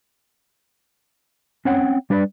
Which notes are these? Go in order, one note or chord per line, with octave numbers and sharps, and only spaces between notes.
C4 C#4 C#5 F#5 G5
G3 D4 B4 C5 D5